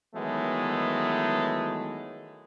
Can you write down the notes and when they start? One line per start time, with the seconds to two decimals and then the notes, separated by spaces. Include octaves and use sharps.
0.15 D#3 E3 F#3 G#3 A3 B3